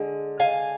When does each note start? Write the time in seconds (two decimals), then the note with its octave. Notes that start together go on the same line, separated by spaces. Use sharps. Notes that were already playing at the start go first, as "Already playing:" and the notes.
Already playing: D3 G#3
0.40 F5 G#5